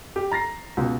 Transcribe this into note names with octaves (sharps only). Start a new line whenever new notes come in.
G4
A#5 A6 A#6 C7
C#2 B2